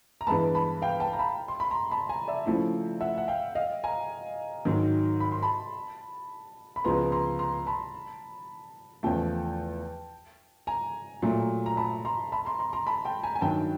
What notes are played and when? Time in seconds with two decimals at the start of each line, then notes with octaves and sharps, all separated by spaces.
0.21 A#5
0.27 G2 E3 G#3 B3 A5 B5
0.55 A5 B5
0.82 F5 G5
1.00 G5 A5
1.13 A#5
1.19 A5 B5
1.48 C6
1.60 B5
1.71 A#5 C6
1.91 A5 B5
2.09 G#5 A#5
2.28 D5 E5
2.46 C#3 F3 A3 C4 E4
3.01 E5 F#5
3.18 F#5
3.28 F5 G5
3.55 D#5 F5
3.84 G#5 A#5
4.65 G#2 D#3 F#3
5.20 B5
5.32 C6
5.42 A5 B5
6.76 B5
6.84 C#2 C#3 F3 G#3 B3 A#5 C6
7.12 A#5 C6
7.39 A#5 C6
7.67 A5 B5
9.03 E2 C#3 F3 A3 G5 A5
10.67 G#5 A#5
11.22 A#2 F#3 A3
11.66 A#5
11.77 A5 B5
12.05 A#5 C6
12.32 A5 B5
12.45 A#5 C6
12.59 A#5 C6
12.73 A#5 C6
12.87 A5 B5
13.05 G5 A5
13.23 G#5 A#5
13.36 G#5
13.41 G2 D#3 F#3 G5 A5